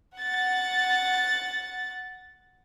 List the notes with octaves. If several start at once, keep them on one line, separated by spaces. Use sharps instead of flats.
F#5 A6